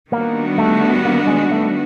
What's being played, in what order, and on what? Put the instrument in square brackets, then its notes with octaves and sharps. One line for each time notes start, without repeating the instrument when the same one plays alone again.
[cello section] D#3 G3 B3 D4 F#4 [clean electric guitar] A#3
[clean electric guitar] A3
A#3
G#3
A3